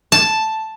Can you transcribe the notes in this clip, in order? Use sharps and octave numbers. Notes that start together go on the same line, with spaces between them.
A5